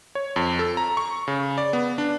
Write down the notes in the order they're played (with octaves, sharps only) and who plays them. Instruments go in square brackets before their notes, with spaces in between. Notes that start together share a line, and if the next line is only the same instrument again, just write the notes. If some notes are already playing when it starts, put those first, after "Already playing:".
[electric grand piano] C#5
F2
A4
A#5
C#6
C#3
D5
B3
D4